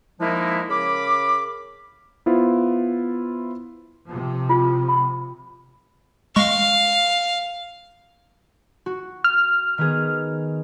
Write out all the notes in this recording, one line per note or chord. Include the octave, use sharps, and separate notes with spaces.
D#3 F3 G#3 A#3 D#4 E4
C#3 A#4 B5 D6
B3 E4 F4 C5
C3 F3
F4
B5
G#3 F5 C#6
F#4
F6
D#3 B3 G#4